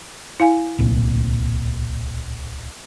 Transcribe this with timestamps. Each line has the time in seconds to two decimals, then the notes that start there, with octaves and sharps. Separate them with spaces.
0.40 E4 F5 G#5
0.78 D1 C2 A#2